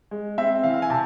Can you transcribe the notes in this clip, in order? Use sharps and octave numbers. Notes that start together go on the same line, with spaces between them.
G#3
C4 E5
E3 F5
F5
G#5
C3 A5